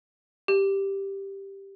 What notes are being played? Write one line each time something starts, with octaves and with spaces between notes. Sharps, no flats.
G4